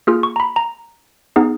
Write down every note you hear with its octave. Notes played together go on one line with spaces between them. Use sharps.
A#3 F4 G#4 F6
C#6
A#5
B5
A#5
B3 D#4 G#4